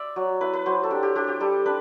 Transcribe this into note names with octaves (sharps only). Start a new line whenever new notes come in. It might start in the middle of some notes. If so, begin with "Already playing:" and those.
Already playing: D5 E5
F#3
E4 B4
B4
F#3 C5
A4
D4 G4
G4
D4 G4
G4
G3 A4
D4 B4